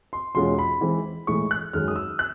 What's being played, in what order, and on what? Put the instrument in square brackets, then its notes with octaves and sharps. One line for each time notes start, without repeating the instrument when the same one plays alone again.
[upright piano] C6
[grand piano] E2 B2 G#3 C#4 F4 [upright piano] C6
[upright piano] B5
[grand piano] E3 G#3 C4
[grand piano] A2 E3 G#3 [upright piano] C#6
[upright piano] F#6
[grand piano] F#2 D#3 G#3 [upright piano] F6
[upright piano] D#6
E6
F#6